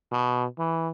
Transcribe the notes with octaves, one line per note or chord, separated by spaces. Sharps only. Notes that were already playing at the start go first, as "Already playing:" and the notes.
B2
E3